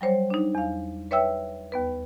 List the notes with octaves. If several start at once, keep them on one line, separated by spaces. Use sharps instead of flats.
F#3 G3 C5 C#5
D4 D#4
E2 F5
B4 C#5 E5 G5 E6
D#2 B3 B4